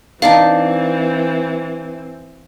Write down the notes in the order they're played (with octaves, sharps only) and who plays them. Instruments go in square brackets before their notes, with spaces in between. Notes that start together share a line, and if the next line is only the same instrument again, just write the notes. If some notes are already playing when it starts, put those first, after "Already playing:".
[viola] E3 C4 [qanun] D4 D#4 D5 [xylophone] F5